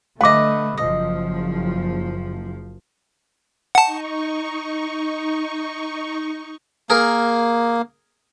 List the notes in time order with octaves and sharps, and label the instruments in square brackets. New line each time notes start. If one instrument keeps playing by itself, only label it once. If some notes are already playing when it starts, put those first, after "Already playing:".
[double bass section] D3 A3 [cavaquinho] B4 D#5 [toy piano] F5 D6
[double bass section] F#1 F3 [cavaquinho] D#5
[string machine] D#4 C#6 [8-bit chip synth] F#5 A5
[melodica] A#3 [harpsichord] G#4 A#4